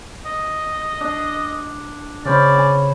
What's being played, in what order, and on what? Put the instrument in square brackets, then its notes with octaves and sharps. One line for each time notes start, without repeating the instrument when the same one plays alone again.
[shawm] D#5
[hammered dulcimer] D4
[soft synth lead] C#3 [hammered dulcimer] C#4 C5 B5 [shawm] D5
[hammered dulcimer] G#5